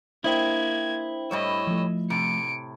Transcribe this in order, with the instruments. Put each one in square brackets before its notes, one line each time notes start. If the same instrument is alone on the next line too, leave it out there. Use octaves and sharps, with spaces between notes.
[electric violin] A#3 G#6 [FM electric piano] D4 C5 G5 [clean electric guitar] E4 [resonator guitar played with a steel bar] D#5
[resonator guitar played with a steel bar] A2 G3 C#5 [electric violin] D#5 E6
[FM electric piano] F3 A3
[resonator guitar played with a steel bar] A2 C3 [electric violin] C#7 D7